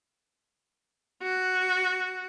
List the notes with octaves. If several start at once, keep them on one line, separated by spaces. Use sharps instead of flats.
F#4